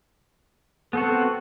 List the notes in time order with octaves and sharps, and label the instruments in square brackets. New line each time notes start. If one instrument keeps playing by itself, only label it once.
[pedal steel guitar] B3 C4 F#4 [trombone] A4